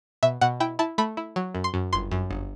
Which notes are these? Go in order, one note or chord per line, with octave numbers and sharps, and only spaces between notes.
B2 E5
B2 F#5
E4 G5
E4 A5
A3 B5
E4
F#3
F#2
C6
F#2
G1 C6
F#2
G1